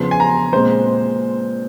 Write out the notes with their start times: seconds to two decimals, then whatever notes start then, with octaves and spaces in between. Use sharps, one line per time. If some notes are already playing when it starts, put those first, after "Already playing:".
Already playing: E2 C#3 F3 C6
0.11 G#5
0.20 A#5
0.53 A#2 G#3 C4 C5